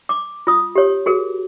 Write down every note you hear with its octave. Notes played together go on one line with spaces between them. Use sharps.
D6
F4 D#6
G4 C#5
F#4 G#4 A#4